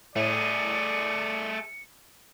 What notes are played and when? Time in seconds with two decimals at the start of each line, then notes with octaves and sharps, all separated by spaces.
0.16 A2 A3 G#4 D5 C#7